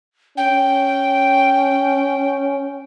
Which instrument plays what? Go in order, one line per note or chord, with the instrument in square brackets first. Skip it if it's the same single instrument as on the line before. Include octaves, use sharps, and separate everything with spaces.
[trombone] C#4 [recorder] G5